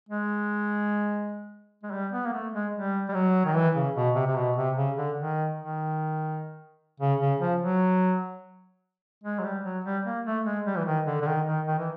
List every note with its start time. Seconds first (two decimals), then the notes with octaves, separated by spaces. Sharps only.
0.09 G#3
1.83 G#3
1.92 G3
2.12 B3
2.26 A#3
2.33 A3
2.53 G#3
2.74 G3
3.09 G3
3.14 F#3
3.46 D#3
3.55 E3
3.75 C#3
3.95 B2
4.15 C3
4.27 C3
4.36 B2
4.56 C3
4.77 C#3
4.97 D3
5.17 D#3
5.58 D#3
7.00 C#3
7.20 C#3
7.40 F3
7.61 F#3
9.24 G#3
9.39 F#3
9.44 G3
9.64 F#3
9.84 G3
10.05 A#3
10.25 A3
10.45 G#3
10.66 G3
10.77 E3
10.86 D#3
11.06 D3
11.22 D3
11.27 D#3
11.47 D#3
11.67 D#3
11.78 E3